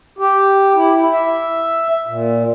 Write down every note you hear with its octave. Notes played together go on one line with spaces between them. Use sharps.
G4
E4
E5
A#2